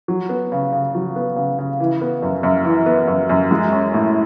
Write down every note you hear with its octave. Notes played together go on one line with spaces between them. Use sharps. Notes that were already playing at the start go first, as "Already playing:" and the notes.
F#3
B3
C#3
C#3
F#3
B3
C#3
C#3
E3
B3
F#2
F#2
E3
B3
F#2
F#2
G#3
C#4
A2